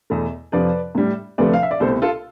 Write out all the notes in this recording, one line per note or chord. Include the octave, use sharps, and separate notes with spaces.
E2 B2 A3
F2 C3 F3 B4 D5
A2 G3
D2 C3 F3 A3 B4 D5
F5
E5
D5
C2 B2 A3 A4 C5
F4 A4